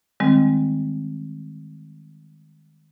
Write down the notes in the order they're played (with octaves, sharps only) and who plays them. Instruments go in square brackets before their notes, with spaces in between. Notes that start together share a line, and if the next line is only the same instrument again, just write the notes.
[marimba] D#3 G3 G#3 C4